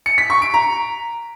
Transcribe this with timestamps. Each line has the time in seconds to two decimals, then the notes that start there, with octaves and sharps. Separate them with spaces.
0.06 C#7
0.18 B6
0.30 C#6
0.42 D7
0.54 A#5